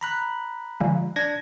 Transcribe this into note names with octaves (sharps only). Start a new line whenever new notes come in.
A#5 B5 F#6
D3 F3 G#3
D4 G#6 A#6